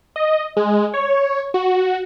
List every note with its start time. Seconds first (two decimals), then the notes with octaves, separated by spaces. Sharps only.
0.16 D#5
0.57 G#3
0.94 C#5
1.54 F#4